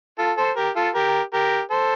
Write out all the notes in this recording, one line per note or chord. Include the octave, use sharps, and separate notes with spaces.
F4 A4
A4 C5
G4 A#4
F4 A4
G4 A#4
G4 A#4
A4 C5